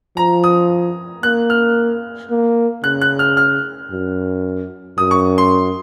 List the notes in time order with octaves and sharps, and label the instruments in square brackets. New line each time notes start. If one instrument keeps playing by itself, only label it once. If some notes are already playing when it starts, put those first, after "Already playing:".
[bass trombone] F3 [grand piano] A#5
[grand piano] D#6
[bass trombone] A#3 [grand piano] F#6
[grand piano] F6
[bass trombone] A#3
[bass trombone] C#3 [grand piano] F#6
[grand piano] F#6
F6
F6
[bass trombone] F#2
[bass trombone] F#2 [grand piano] D#6
[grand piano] C#6
C6